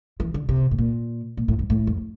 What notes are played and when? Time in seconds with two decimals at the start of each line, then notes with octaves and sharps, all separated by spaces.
0.20 E3
0.34 D3
0.49 C3
0.71 A2
0.78 A#2
1.37 A#2
1.48 A2
1.59 G2
1.70 A2
1.87 F2